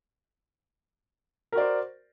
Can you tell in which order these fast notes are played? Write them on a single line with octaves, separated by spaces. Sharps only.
A#4 F#4 D5 C5